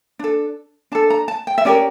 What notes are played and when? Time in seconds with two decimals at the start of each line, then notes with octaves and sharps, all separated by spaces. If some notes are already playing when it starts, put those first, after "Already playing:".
0.19 D4 A4
0.92 D4 A4 A5
1.10 A#5
1.28 A5
1.47 G5
1.58 E5
1.65 C#4 G4 A#4 D5